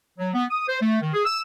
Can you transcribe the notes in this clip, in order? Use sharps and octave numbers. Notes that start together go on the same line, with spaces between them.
F#3
B3
D#6
C5
A3
D#3
G#4
E6